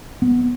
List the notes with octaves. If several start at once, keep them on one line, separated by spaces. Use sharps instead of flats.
B3